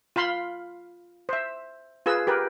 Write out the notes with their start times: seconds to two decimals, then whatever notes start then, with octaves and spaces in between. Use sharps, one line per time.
0.16 F4 F5 B5 C6
1.29 C5 E5
2.06 F4 G#4 B4 E6
2.27 G4 A#4 B4